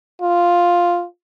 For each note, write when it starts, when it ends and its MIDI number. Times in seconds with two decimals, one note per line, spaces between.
0.22 1.04 65